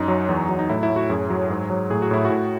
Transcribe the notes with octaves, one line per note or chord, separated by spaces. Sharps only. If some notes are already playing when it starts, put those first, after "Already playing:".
Already playing: F#2 D#4
F#3
E2
F#3
D#4
A2 E4
E4
A2
F#4
F#2 G#4
F#3
G#2
F#3
A2 G#4
F#4
A2 E4
F#4
A2